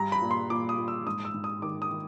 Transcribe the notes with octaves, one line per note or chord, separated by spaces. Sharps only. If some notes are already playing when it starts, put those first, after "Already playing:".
Already playing: G2 G3 A#5
B5
A#2
C6
A#2 D6
D#6
A#2
E6
G#2 D#6
E6
G#2
D#6
D#3 D6
D#6
D#3